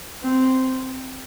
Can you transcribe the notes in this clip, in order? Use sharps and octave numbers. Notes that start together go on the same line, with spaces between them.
C4